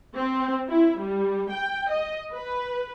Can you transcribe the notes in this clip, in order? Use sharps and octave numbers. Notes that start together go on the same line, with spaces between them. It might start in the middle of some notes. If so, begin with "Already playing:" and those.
C4
E4
G3
G5
D#5
B4